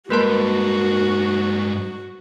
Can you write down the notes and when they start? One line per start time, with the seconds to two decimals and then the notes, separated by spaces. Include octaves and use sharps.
0.10 G2 G#3 A#3 F#4 A#4 B4 A5 C6